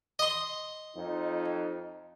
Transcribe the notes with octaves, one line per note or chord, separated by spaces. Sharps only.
D#5 C6
F2 F3 D#4